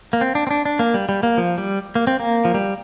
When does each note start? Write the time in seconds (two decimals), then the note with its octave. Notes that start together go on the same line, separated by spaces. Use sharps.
0.13 A#3
0.21 C4
0.35 D4
0.47 C4
0.51 D4
0.65 D4
0.79 A#3
0.94 G3
1.09 G3
1.23 A#3
1.38 F3
1.58 G3
1.95 A#3
2.07 C4
2.20 A#3
2.45 F3
2.54 G3